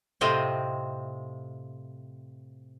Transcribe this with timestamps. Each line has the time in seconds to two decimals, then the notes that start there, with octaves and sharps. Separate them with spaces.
0.21 A2 C3 C4 F4 D#5 G5